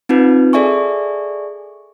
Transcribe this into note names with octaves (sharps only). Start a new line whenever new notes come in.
C4 D#4 F4 B4
G#4 A4 D5 E5 G#5 C#6